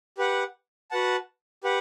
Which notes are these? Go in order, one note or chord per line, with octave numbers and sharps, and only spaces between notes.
G4 B4 F#5
F#4 B4 F#5 A5
G4 B4 F#5